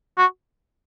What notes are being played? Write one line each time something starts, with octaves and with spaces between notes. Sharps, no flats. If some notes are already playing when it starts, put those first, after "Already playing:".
F#4